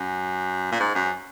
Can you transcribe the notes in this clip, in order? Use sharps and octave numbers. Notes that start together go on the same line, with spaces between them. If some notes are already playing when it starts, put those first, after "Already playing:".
Already playing: F#2
A#2
G#2
F#2